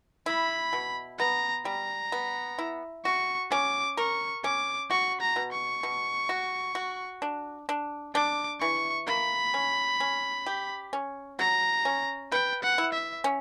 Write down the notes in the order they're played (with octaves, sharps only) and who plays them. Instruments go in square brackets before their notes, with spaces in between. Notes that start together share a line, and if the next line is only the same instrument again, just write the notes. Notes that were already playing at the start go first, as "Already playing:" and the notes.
[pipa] E4 [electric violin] B5
[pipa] B2
[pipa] B3 [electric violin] A#5
[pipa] G3 [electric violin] A#5
[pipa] B3
E4
[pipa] F#4 [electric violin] C#6
[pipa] C#4 [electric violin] D6
[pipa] A#4 [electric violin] C#6
[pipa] C#4 [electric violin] D6
[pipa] F#4 [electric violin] C#6
[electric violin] A#5
[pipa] B2
[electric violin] C#6
[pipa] B2
F#4
F#4
D4
D4
[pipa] D4 [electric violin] D6
[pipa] E3 [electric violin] C#6
[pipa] A#3 [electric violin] B5
[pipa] C#4
C#4
G4
C#4
[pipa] F#3 [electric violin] A#5
[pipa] C#4
[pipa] B4 [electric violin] G5
[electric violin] F#5
[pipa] E4
[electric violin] E5
[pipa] C#4